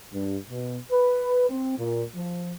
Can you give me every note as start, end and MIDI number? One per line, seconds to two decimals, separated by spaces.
0.14 0.37 43
0.50 0.79 47
0.92 1.49 71
1.50 1.77 60
1.78 2.04 46
2.16 2.54 53